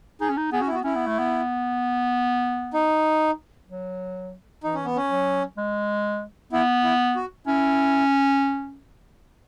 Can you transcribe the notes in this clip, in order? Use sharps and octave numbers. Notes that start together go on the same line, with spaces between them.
D#4 G#4
C#4
D#4
B3 G#4
C#4 F#4
E4
B3 F#4
C#4 E4
B3
A3
B3
D#4
F#3
E3 D#4
C#4
B3
C#4
F#3
G#3
B3 E4
E4
F#4
C#4 E4